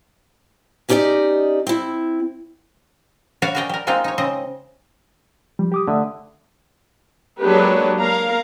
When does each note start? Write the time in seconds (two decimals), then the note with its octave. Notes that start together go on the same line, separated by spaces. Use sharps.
0.89 C#4 D#4 G4 A#4 D5 D#5
1.67 C4 E4
3.42 F#4 B4 C#5 D5 F5
3.55 F#4 G#4 A#4 D5 D#5 G5
3.69 G3 A#4
3.87 G#3 A#3 C4 D#4 F4
4.04 D#4 C#5
4.18 C#3 C4 D#5
5.59 F3 G3
5.72 G4 D6 D#6
5.88 D3 A3 E5 D#6
7.40 F#3 G#3 A#3 D4 G4 B4
7.99 A#3 A#4 F5 A#5